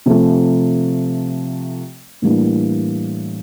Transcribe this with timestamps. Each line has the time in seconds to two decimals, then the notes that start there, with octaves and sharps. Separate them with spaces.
0.06 C3 F3 A3
2.22 A2 E3 G3 A#3 D4